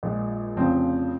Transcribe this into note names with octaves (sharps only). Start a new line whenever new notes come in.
A#1 A#2 G#3
F1 F2 C#3 F3 C4